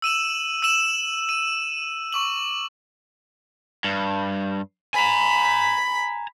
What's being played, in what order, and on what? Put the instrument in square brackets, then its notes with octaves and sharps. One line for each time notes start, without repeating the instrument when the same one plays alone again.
[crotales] E6 D#7 E7 F#7
E6 D#7 E7 F#7
D#7
C#6 D6 F#7
[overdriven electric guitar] G2
[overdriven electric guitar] G#5 A#5 [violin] B5